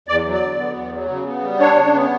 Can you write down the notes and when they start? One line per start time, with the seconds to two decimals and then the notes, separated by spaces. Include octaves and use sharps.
0.08 E2 D5
0.25 F#3
0.34 D5
0.41 D3
0.59 B3
0.75 E2
0.93 F#3
1.09 C#3
1.26 B3
1.42 G3
1.60 D4 C#5
1.76 C#3
1.94 B3